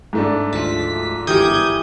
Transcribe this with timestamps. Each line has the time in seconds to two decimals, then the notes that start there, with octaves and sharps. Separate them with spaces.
0.13 G#2 A3 D4
0.53 D2 F3 A5 B6
1.27 G1 E3 G4 A#4 D#6 G6 G#6